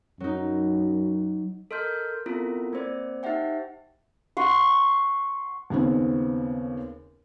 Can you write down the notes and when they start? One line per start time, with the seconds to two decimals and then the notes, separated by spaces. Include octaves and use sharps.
0.20 F#2 F#3 D#4
1.71 A4 A#4 D#5 C6 F6 G6
2.26 B3 C4 E4 F4 A4 A#4
2.73 A#3 C4 C5 D5
3.23 D#4 G4 C5 E5 F#5 G5
4.37 F#5 C6 C#6
5.70 D#2 C#3 B3 C4